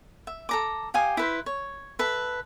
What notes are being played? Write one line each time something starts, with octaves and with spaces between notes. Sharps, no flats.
E5
A4 A#5 D6
G4 F5 G#5 D#6
E4 B4 C5
C#5
A4 B4 E5